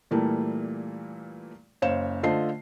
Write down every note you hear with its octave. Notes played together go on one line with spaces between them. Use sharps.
A#2 E3 G3 A3 A#3
F#1 C5 C#5 F5 E7
D3 A3 F4 C5 D#5 C7